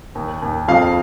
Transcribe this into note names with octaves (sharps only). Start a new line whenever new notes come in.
D#2
D#2
F2 F5